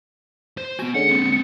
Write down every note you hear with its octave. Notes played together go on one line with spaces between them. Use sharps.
C5
B3 F#4 G#5
D3 G#3 C#4 F#5 C#7
A#3 C4